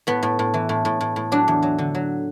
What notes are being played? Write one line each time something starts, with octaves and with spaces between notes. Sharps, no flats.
A2 B3
A2
A2
E3
A2
A2
A2
A2
F#3 D4
E2
F#3
D3
F#3